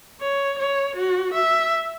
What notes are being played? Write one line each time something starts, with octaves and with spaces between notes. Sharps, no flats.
C#5
C#5
F#4
E5